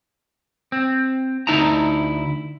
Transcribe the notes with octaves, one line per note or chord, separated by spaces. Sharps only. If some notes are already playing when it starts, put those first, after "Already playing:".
C4
D2 D#4 E4 A5 A#5